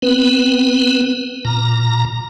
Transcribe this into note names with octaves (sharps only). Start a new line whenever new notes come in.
B3 C4 B4
A#2 A#5